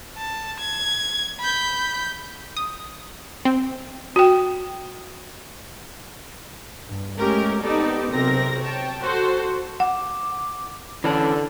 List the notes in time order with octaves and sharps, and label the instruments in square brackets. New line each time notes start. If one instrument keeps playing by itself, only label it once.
[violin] A5
G#6
B5 G6
[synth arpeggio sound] D#6
C4
[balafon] F#4 G5
[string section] G2
G#3 A3 C#4 G4 A#4
B3 C4 D#4 G4 A4 D5
B1 C3 C4 A#4 A#6
C#5 G5 A5
F#4 A4 C5
[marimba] F#5 [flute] D6
[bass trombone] D3 [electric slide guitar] E3 C#4 D4 [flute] A4